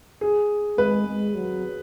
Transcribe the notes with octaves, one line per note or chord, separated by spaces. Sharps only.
G#4
G#3 B4
G#3
F#3